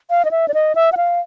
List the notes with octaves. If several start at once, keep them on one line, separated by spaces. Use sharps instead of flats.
F5
D#5
E5
D5
D#5
E5
F#5
F5